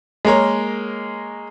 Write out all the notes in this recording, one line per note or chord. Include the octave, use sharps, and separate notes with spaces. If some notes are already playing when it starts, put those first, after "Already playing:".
G#3 A#3 A#4 C#5